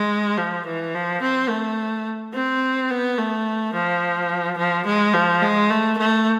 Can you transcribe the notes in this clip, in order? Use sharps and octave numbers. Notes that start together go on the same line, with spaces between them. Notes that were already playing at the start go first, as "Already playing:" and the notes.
Already playing: G#3
F3
E3
F3
C4
A3
C4
B3
A3
F3
F3
G#3
F3
G#3
A3
A3